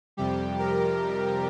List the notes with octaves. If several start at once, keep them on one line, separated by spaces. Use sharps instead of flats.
F2 C3 G3 G4
A#4